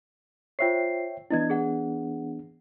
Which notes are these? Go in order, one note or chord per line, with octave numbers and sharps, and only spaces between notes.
F4 C5 C#5 E5 G5 C7
E3 B3 D4 E4 D#5 G#6
G#4 F#5